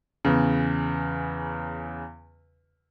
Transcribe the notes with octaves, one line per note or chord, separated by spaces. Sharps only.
E2 C#3